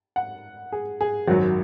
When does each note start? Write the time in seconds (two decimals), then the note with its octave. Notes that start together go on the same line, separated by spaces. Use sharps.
0.16 F#5
0.72 G#4
1.01 G#4
1.28 G#1 F#2 F#3 F#4